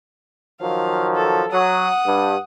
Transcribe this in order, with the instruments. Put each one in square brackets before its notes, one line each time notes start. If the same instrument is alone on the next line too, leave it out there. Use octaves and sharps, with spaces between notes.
[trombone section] D#3 F3 F#3 [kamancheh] F5
[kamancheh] A4
[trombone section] F#3 [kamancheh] F#5 D#6
[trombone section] G2